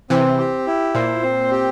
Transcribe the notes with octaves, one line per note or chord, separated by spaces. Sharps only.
C3 E3 C4
G4
E4
A#2 C5
C4
G4